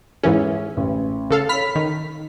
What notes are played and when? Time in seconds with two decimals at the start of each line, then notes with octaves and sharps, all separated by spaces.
0.23 G#2 E3 C#4 G#4 C#5 E5
0.77 A1
1.31 C#3 A4 F5
1.49 C#5 B5 F6 B6
1.75 D#3